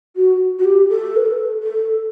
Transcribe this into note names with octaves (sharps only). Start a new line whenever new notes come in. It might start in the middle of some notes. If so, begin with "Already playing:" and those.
F#4
F#4
G4
A4
B4
A4
A4